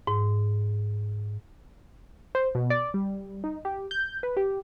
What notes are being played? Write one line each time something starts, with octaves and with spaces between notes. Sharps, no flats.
G#2
C5
B2
D5
G3
D#4
G4
G6
B4
G4